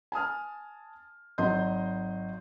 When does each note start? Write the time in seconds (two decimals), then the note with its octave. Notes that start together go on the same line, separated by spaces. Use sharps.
0.12 G#5 A5 D#6 F6
1.38 G#1 F#3 D#5 C6 G6